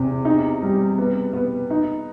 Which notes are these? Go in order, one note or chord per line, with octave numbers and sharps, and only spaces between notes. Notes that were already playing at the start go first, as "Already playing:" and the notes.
Already playing: E2 C3
D#4
G3
B3
B3
D#4